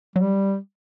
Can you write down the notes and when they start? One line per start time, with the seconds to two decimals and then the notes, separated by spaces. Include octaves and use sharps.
0.16 F#3 G3